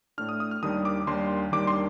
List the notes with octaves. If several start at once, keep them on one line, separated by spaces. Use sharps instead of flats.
A2 A3 D4 F6
D#6
D#6
F6
D#2 D#3 G3 D4 D#6
D6
D#2 D#3 G3 D4 C6
D#2 D#3 G3 D4 D6
C6